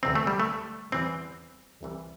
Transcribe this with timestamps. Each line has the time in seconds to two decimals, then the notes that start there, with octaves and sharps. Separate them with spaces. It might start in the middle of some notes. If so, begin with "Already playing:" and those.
0.03 D2 C3 E3 C4
0.15 A3
0.27 G3
0.40 A3
0.92 E2 E3 G3 C4
1.83 C2 C3 E3 G3